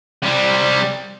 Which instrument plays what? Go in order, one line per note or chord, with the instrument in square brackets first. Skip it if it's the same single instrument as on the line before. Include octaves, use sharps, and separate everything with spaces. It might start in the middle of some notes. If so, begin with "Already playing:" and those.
[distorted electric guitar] C3 G3